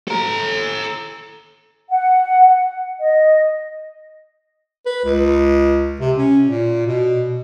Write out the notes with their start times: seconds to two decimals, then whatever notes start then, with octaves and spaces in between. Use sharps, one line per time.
0.08 A4 A#5
1.91 F#5
3.00 D#5
4.86 B4
5.05 C#2
6.00 C3
6.18 C#4
6.47 A#2
6.87 B2